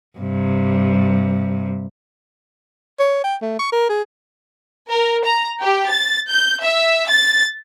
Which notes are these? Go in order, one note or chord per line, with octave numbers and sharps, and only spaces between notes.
G2 C3
C#5
G5
A3
C#6
A#4
G#4
A#4
A#5
G4
A6
G6
E5
A6